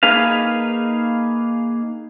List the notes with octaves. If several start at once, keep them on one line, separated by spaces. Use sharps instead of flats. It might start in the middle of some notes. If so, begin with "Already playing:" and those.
A#3 D#4 G#4 B4 F5